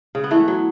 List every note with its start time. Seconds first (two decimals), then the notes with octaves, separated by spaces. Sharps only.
0.15 C#3
0.24 B3
0.31 E3 A3
0.48 F#3